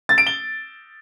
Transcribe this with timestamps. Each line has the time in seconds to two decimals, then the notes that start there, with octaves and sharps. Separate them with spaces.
0.09 A6
0.18 D7
0.26 G7